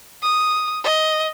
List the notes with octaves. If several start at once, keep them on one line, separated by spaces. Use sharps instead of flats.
D#6
D#5